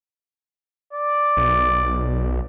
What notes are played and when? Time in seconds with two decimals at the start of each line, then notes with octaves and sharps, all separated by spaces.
0.93 D5
1.37 B1